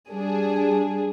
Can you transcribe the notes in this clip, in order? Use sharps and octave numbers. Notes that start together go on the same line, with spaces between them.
G3 D4 G#4